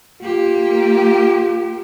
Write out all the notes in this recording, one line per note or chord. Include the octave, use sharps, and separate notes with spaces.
A#3 F4 G4